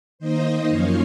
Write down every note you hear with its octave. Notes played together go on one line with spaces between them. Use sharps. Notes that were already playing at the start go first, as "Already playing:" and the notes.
D#3 A#3 D#4 C5 D#5
F#2 F3 A#3 C#4 F4 C#5 F5